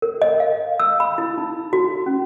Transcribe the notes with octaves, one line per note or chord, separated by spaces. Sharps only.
A#4
D#5
F5
E6
B5
E4
D#4
F#4
C#4